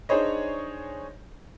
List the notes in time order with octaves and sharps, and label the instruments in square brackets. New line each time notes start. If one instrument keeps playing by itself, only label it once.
[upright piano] D4 D#4 G#4 C5 C#5 D#5